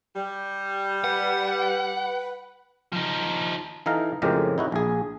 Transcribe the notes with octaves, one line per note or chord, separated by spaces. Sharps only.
G3
B4 F#5
F3 D#4
E3 D#4 A4 F5 A#5
F2 A2 C#3 G#3 G4 A#4
D#4 E4 F#4
A#1 G#4